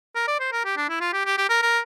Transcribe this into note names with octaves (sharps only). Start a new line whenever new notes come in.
A#4
D5
C5
A#4
G4
D4
E4
F4
G4
G4
G4
A#4
A#4